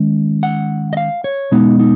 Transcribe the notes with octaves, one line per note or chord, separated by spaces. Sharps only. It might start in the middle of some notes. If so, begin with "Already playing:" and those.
Already playing: D#3 G#3 C#4
F#5
D#5
F5
C#5
B2 G#3 B3 D#4
D#4